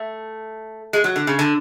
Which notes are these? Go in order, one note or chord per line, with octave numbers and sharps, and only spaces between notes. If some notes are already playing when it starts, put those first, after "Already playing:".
Already playing: A3
G#3
F#3
D3
C#3
D3